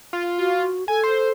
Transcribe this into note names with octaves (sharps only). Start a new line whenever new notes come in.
F4
F#4
A4 G#5
C5